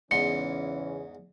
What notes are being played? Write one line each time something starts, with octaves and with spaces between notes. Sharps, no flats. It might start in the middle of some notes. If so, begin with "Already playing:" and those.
E2 G#2 C#3 E3 C#4 C6 C#7